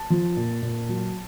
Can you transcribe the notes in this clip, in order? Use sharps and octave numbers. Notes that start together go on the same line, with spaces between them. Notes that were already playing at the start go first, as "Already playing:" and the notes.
Already playing: A5
F3
A#2
A#2
F#3